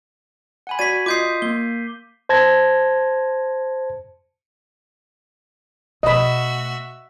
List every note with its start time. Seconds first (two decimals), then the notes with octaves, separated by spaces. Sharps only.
0.67 F#5 G#5 B5
0.79 F#4 D5 G#6 B6 D#7
1.06 F4 D#5 D6 D#6 G6 C7
1.42 A#3 G7
2.29 C5 A5 G#6 A#6
6.03 B2 A3 F#4 D#5 E5 B5